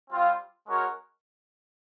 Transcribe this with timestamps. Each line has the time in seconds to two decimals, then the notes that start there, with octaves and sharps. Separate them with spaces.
0.11 G3 C4 F4
0.66 G#3 C#4 F#4 A#4 C#5